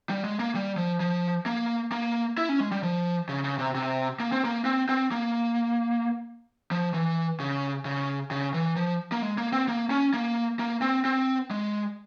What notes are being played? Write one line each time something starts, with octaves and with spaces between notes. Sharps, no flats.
G3
G#3
A#3
G3
F3
F3
A#3
A#3
E4
C#4
G#3
G3
F3
C#3
C#3
C3
C3
A#3
C4
A#3
C4
C4
A#3
F3
E3
C#3
C#3
C#3
E3
F3
A#3
G#3
A#3
C4
A#3
C#4
A#3
A#3
C4
C4
G#3